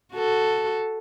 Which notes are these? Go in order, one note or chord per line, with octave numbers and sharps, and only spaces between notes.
F#4 A4